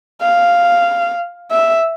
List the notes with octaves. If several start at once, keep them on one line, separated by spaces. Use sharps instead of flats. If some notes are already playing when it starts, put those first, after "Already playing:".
F5
E5